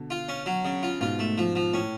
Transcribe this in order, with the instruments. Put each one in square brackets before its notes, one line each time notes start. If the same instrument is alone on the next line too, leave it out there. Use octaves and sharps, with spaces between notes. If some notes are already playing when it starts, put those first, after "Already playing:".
Already playing: [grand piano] B2 D3
[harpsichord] F4
C#4
F#3
C#3
F4
[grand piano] G#2 B2 [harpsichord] F4
[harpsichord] A3
F3
F3
[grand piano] A2 [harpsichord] C#4